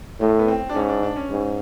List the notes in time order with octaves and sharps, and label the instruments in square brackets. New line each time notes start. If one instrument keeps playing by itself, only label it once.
[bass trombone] A2 [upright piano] A3
[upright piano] B3
C4
D4
[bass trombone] G#2 [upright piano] C#4
[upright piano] D4
D4
C#4
[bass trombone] G#2